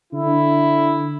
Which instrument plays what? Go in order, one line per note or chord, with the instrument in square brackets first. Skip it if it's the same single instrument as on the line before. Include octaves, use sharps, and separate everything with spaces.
[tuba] D3 [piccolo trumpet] E4